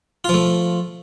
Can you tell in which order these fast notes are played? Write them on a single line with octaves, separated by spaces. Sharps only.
F4 F3 A3